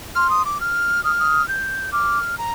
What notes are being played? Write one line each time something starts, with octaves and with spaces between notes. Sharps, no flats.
C6 F6
D#6
D6
F6
D#6 F6
D#6
G6
D6 F6
A#5